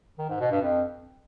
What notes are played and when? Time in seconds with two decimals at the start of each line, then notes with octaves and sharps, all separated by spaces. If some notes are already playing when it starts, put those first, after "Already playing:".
0.19 D#3
0.30 G#2
0.40 B2
0.51 G2
0.62 F2